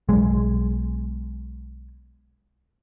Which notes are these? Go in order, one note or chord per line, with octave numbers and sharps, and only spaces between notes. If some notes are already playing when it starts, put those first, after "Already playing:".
B1 G#3